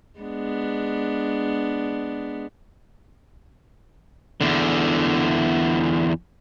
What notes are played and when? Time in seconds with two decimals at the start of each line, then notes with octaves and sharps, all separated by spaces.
0.19 G#3 B3 D4
4.41 E2 D3